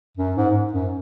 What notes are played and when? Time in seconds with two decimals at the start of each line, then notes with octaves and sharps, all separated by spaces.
0.17 F#2
0.36 G#2
0.73 F#2